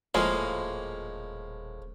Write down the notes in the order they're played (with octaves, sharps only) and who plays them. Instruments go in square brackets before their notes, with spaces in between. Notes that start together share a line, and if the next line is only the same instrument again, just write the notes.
[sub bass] D#1 [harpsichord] A2 F3 [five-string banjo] G#3 A#3